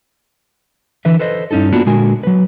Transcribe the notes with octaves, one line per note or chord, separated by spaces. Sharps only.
D3 E3 B4 E5
A4 B4 C5 D#5
G2 C#4 D#4 E4 A4
A#3 B3 D4 F4 F#4
A#2 D3 G#3 F#4 A#4 G#5
F#3 B4